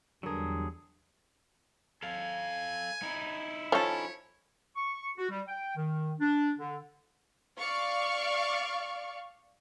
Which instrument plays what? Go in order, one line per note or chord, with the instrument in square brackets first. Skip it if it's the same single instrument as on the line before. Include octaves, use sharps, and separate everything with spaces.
[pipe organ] E2 G3 [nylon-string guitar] D3 A#4 [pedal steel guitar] F#3 G#4
[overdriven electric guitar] A4 F5 [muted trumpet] G#5
[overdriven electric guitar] D#4 E4
[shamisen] F3 [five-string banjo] C#4 A4 [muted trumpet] C#5
[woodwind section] C#6
F#4
G3
G5
D#3
D4
D3
[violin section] D5 F5 C#6